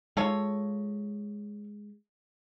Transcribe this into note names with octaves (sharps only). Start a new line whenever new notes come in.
G#3 F4 A4 C#5